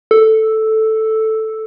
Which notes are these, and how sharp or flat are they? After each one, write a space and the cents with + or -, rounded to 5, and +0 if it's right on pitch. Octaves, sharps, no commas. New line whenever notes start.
A4 +0